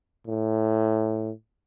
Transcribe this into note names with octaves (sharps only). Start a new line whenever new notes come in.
A2